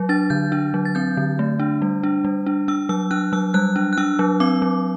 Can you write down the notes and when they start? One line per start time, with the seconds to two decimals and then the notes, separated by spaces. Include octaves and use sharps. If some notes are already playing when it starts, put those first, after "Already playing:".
Already playing: F#3
0.09 D4 A6
0.30 D3 G6
0.52 D4
0.74 F#3
0.85 A6
0.95 C4 G6
1.17 D3
1.39 A3
1.60 D4
1.82 G3
2.03 D4
2.25 G3
2.46 D4
2.68 D4 E6
2.89 F#3 E6
3.11 D4 F#6
3.33 F#3 E6
3.54 G3 F#6
3.76 D4
3.93 F#6
3.98 D4 E6
4.19 F#3
4.40 C4 D6
4.62 F#3